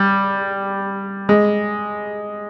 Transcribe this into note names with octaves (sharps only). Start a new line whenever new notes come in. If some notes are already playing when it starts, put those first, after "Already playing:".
Already playing: G3
G#3